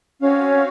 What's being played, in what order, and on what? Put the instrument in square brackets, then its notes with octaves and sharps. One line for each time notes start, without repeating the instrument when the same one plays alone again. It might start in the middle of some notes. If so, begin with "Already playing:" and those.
[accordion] C4 F#4 C#5 F5 [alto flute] C#4